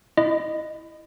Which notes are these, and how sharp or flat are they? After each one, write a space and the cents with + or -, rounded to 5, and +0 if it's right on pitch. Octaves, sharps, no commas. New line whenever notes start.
E4 +0 D#5 -15 B5 +20